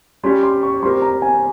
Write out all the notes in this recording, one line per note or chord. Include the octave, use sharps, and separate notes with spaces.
G3 C#4 G4 C6
C6
C#6
G3 C4 G4 A#4 C6
A#5
G#5